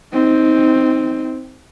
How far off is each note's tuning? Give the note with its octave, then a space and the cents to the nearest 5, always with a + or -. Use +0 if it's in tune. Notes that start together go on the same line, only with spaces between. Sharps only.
C4 +0 D#4 +20